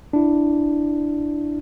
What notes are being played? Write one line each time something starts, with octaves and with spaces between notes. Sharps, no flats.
D4 E4